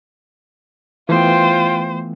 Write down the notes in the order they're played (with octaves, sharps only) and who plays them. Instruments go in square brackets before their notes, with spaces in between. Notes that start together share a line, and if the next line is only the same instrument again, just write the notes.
[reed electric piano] E3 A3 B3 [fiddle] F4 G5 [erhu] C5